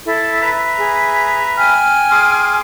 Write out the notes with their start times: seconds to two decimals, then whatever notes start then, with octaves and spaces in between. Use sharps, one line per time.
0.05 E4 A4
0.42 B4 E5 A#5
0.78 G#4
1.57 G5 G#5 F6
2.11 G#4 C6 D6